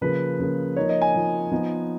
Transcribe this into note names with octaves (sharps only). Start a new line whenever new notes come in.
C#3 F3 A#3 B4
C#3 F3 A#3
F3 A#3 D#4 C#5
D#5
G#5
F3 A#3 D#4
F3 B3 D#4